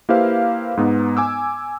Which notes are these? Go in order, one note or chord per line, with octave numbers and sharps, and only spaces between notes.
A#3 E4 G4 B4 C5 F5
G#2 B3 D#4
G#5 D6 E6